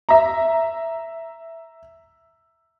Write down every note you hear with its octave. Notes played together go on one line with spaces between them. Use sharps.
E5 A#5